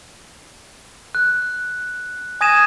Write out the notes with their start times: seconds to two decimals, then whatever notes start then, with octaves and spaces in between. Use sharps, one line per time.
1.15 F#6
2.41 G#5 D#6 G#6 A#6 D#7 E7